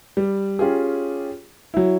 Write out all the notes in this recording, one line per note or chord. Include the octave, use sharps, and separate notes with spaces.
G3
C#4 F4 G4 G#4
F#3 E4